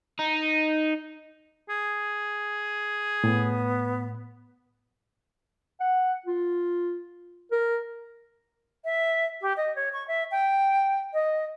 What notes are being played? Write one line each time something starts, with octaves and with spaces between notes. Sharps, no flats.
D#4
G#4
A2 B3
F#5
F4
A#4
E5
G4
D#5
C#5
C#6
E5
G5
D#5